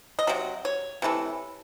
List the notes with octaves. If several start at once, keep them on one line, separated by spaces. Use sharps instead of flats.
D#5
C3 F#3
C#5
C3 E3 A3